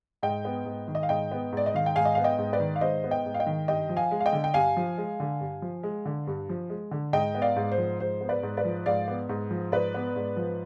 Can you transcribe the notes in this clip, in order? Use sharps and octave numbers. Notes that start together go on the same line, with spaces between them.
G#2 D#5 G5
B3
G#2
D#3
D#5
F5
G#2 D#5 G5
B3
G#2 D5
D#5
D#3 F5
G5
G#2 F5 G#5
D#5
B3 F5
D#5 G5
G#2
B4 D5
D#3
F5
G#2 C5 D#5
B3
D#5 G5
G#2
F5
D#5 G5
D#3
G2 D#5 G5
F3
F5 G#5
G#3
F5
D#5 G5
D3
G5
G2 F5 G#5
F3
G#3
D3
G2
F3
G#3
D3
G2
F3
G#3
D3
G#2 D#5 G5
B3
D5 F5
G#2
C5
F3
G#2 C5
B3
B4 D5
G#2
B4 D5
F3
G#2 D5 F5
B3
G#2
F3
G#2 B4 D5
B3
G#2
F3